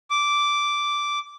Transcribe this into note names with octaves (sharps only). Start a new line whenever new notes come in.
D6